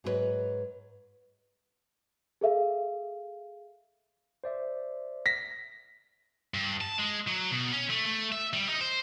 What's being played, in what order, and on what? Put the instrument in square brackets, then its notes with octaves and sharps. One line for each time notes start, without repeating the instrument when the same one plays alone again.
[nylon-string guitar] G#2 F#3 E4 B4 C#5 D#5
[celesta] G#4 A4 E5 F5
[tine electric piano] C5 D5 E5
[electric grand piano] A#6 B6
[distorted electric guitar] G2
A5
G#3
F#3
B2
C#4
A3
A3
E5
G3
D#4
C5